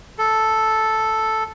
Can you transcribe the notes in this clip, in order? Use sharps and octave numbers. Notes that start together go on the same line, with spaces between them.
A4